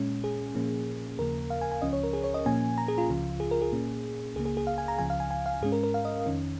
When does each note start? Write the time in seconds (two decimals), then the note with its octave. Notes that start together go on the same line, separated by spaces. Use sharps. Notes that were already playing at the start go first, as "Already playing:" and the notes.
Already playing: A#2 G#3 C#4
0.24 G#4
0.55 A#2 F3 A#3 C#4
1.19 D#2 C#3 F3 A#3 A#4
1.50 F5
1.61 G#5
1.72 G#5
1.82 C#2 C#3 F3 C#4 D#5
1.93 C#5
2.04 A#4
2.13 G#4
2.24 C#5
2.34 D#5
2.46 A#2 F3 A#3 C#4 G#5
2.78 A#5
2.88 G#4
2.98 F4
3.09 C#2 C#3 F3
3.40 G#4
3.51 A#4
3.62 G#4
3.72 A#2 A#3 C#4
4.35 C#2 C#3 A#3 G#4
4.45 G#4
4.57 G#4
4.67 F5
4.78 G#5
4.88 A#5
4.98 C#2 C#3 F3 G#5
5.10 F5
5.20 G#5
5.31 G#5
5.46 F5
5.62 G#2 G#3 C#4 G#4
5.72 A#4
5.83 A#4
5.94 F5
6.05 D#5
6.26 F2 D#3 C#4